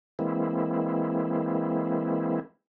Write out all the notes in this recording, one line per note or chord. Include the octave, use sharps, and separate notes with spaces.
E3 G#3 A#3 C4 E4